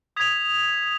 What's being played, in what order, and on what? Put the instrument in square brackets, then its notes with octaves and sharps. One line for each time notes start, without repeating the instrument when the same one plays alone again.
[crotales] D#6 G#6 B6 F7